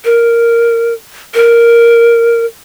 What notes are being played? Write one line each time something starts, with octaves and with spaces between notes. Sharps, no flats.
A#4
A#4